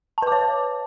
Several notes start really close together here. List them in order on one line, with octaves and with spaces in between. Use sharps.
A5 B4 D6 C#5